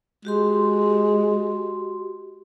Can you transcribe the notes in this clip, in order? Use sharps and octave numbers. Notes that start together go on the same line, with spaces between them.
G#3 F#4 G4 C6